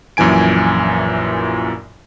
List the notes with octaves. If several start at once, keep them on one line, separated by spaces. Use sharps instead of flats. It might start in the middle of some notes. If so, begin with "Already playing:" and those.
A#1 F#2 A#2 E3 G#5 D7